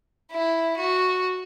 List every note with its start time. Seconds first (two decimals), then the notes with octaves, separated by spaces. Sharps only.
0.31 E4
0.76 F#4